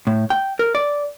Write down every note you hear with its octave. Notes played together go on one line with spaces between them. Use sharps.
A2
G5
A#4
D5